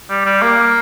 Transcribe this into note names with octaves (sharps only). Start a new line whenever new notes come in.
G3
G3
A#3